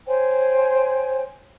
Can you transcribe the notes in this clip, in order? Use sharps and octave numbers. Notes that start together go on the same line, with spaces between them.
C5 C#5 G5 G#5